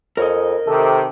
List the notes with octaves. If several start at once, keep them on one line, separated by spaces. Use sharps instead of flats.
F2 A#4 C#5 D#5
C3 D#3 A4